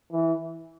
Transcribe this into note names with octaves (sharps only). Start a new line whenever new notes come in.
E3